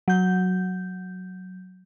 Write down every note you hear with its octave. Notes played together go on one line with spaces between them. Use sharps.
F#3 G6